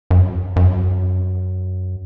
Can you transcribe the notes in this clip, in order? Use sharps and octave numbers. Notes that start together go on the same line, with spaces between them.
F#2
F#2